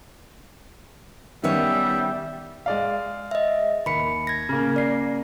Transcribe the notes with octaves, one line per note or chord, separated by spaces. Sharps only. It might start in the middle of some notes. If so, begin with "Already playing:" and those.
D#3 G3 B3 C#4 C#5 E5
G#3 D5 F5
D#5 E5
D#2 B5 C#7
G#6 A#6
C#3 A#3
D5 C7